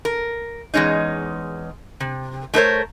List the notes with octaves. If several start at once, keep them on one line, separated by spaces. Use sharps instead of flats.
A#4
E2 G2 G#3 C#4 D#4
C3
A3 D#4 E4 A#4 C5 C#5